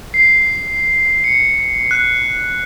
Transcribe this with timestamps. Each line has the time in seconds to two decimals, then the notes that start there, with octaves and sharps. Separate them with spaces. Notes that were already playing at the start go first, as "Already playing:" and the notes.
0.14 C7
1.24 C#7
1.91 F#6